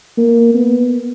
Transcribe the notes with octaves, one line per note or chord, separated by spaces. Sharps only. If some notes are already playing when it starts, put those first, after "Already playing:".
A#3
B3